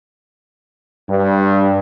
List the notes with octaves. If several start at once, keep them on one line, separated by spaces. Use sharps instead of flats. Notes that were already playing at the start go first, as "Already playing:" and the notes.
G2